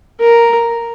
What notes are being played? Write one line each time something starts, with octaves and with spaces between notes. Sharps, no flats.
A#4